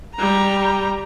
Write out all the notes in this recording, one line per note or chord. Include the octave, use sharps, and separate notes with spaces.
G3 A#5